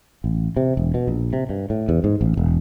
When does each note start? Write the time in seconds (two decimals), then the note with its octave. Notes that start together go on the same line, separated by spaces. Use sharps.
0.24 A1
0.57 C3
0.77 E1
0.94 B2
1.08 A#1
1.33 C3
1.49 G2
1.70 A2
1.89 E2
2.04 G#2
2.21 A1
2.37 E1